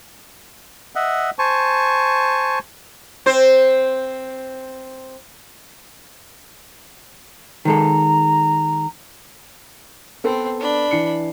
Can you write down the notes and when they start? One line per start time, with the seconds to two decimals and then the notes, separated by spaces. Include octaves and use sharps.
0.95 D#5 E5 F#5
1.39 C5 G#5 A5 C#6
3.26 C4 C5
7.65 D#3 G#3 A4 A#5
10.24 B3 C4 A4 B4
10.60 D4 B5
10.91 E3 C7 C#7